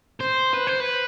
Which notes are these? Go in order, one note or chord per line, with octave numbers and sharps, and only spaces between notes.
C5
B4
C5
B4